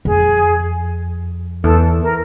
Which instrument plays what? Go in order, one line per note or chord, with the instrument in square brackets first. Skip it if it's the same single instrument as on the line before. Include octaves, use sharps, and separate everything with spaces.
[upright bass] F2 [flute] G#4
[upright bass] E2 [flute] A4
[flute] A#4